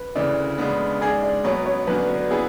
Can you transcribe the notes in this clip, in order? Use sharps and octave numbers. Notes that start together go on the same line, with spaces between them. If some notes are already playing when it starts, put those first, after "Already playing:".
Already playing: B4
D2 C#3 E3 D5
C#3 G#3 B3 D4
G#2 G#3 D4 G#4 D5 G#5
D5
B2 F#3 B3 C#5
C#5
F#2 D3 F#3 B3 D4 B4
B4
F#3 B3 E4 G#4 B4